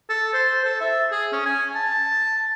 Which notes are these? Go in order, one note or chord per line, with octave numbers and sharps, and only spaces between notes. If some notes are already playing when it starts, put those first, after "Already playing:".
A4
C5
A4
E5
G#4
C#4
G#5
A5